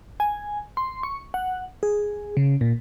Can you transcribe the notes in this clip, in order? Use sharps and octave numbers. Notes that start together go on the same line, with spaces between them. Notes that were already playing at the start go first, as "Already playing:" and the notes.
G#5
C6
C#6
F#5
G#4
C#3
A#2